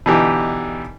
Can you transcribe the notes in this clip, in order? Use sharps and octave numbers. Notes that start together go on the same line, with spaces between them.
B2 D3 E3 D#4 G4